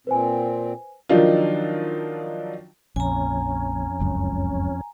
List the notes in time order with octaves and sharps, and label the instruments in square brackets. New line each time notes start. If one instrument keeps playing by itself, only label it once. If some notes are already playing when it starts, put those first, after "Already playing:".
[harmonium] A#2 C4 [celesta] B4 C5 G#5
[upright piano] D#3 F3 F#3 D4 D#4 F4
[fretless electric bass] A#1 [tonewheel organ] F2 C#4 [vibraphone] G#5 A#5
[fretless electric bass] F#1 C#2 F#2